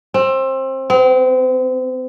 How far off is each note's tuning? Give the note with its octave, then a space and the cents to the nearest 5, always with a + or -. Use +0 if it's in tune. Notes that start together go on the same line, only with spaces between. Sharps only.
C4 +25
C4 -35